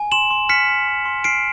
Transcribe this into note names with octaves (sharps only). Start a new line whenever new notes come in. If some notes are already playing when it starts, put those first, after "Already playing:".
Already playing: G#5
C6 E7 F#7
C6
F6 B6 C#7
F6
C6
C6
F6 C7 D7